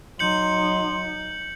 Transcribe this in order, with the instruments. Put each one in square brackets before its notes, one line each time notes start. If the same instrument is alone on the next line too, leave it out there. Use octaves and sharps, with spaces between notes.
[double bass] F#3 D#4 [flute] C6 [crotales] G6 C#7 F#7